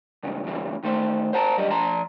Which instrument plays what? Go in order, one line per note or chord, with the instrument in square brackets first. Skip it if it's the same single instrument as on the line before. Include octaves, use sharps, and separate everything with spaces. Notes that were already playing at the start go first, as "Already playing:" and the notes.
[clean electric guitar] C#2 G2 C#3
E2 G2 C#3 E3
D#3 A3 C5
C5 F#5 A5 A#5
F#2 G3 D#5
F3 A5 A#5 C6